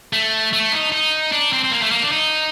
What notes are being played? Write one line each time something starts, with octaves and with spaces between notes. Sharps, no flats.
A3
A3
D#4
D#4
D4
C4
C4
A#3
A3
A#3
D4
D#4